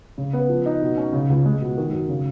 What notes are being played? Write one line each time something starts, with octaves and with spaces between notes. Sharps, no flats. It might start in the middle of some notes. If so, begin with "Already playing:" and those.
C#3
B3
F3
D#4
B2
C#4
C#3
C#2
G#3
B2
D#3
F#2
C#3